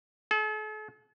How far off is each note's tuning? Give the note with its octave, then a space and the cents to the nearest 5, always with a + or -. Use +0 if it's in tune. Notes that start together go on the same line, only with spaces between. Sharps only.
A4 -45